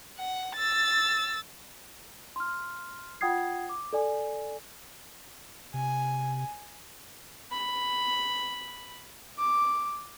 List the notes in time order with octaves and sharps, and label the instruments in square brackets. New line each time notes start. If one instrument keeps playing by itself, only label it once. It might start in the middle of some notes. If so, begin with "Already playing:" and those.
[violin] F#5
E6 A6
[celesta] C6 F6
F4 F#5 G5 D#6 G#6 C7
D6
A4 D5 G#5
[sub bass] C3 [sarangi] G#5
[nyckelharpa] B5
D6